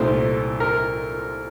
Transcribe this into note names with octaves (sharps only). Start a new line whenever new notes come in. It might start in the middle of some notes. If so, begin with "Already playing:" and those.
Already playing: C2 A#2 A3 D#4 C5
A#4